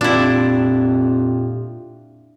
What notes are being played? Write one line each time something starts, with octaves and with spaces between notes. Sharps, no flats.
F2 A#2 D4 E4 F4 G4